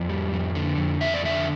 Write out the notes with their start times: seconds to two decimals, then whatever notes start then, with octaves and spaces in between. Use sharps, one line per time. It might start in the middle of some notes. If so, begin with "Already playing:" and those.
Already playing: F2 D5
0.09 G3
0.32 F2
0.55 D3
0.78 F2
1.01 F2 E5
1.14 D5
1.24 D3 E5